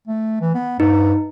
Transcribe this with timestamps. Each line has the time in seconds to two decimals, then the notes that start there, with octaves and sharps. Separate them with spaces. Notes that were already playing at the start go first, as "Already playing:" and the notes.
0.07 A3
0.41 E3
0.55 B3
0.80 G2 D#4